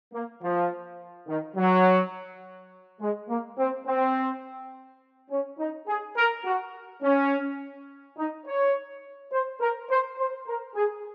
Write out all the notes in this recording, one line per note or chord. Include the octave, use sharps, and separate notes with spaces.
A#3
F3
D#3
F#3
G#3
A#3
C4
C4
C#4
D#4
G#4
A#4
F#4
C#4
D#4
C#5
C5
A#4
C5
C5
A#4
G#4